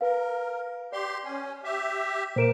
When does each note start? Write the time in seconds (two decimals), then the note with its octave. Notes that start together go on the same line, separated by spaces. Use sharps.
0.01 A#4 B4 F5
0.92 G4 D5 C6
1.24 C#4
1.64 G4 E5
2.36 A#2 A#4 C5 D7 E7